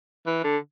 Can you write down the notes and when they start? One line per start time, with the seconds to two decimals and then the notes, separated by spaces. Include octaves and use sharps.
0.26 E3
0.44 D3